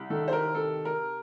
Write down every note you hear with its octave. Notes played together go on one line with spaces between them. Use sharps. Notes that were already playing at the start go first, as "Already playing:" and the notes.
Already playing: C2
D#3 A4
C5
A#4
C3 A4
A#4